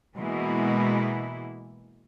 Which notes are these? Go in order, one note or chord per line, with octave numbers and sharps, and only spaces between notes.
B2 E3 G#3 A#3 E4